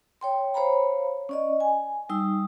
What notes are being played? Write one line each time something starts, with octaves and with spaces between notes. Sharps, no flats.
C#5 G5 C6
C5 C#5 F5 A#5 B5
C#4 D5 D#5
G#5
G3 D#4 E6